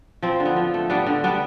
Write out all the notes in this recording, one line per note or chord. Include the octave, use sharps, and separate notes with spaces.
F3 C4
D3
B3
F3
A3
G3 B3 D4
D3
G3 B3 D4